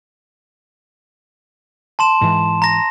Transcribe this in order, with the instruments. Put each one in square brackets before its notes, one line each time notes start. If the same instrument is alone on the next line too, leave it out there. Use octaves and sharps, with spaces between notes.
[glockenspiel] A5 C6 E7
[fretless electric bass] G#2 E3
[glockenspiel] A#5 A#6